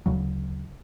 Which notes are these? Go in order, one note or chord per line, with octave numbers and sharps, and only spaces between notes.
D2 C#3 F#3